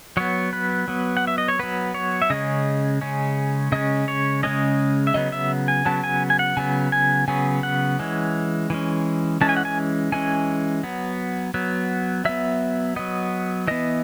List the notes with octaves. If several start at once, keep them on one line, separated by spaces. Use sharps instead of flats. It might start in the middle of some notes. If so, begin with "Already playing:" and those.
F#3 B3 C#5
B4
F#3 B3
F#5
E5
D#5
C#5
F#3 B3 B4
C#5
E5
C#3 G#3 C#4 D#5
C#3 G#3 C#4
C#3 G#3 C#4 D#5
C#5
C#3 G#3 C#4 D#5
E5
C#3 F#3 B3 D#5
E5
G#5
C#3 F#3 B3 A5
G#5
G#5
F#5
C#3 F#3 B3 G#5
G#5
C#3 F#3 B3 G#5
F#5
E3 G#3 C#4
E3 G#3 C#4
E3 G#3 C#4 A5
G#5
F#5
G#5
E3 G#3 C#4 G#5
F#3 B3
F#3 B3
F#3 B3 E5
F#3 B3 D#5
E3 B3 D#5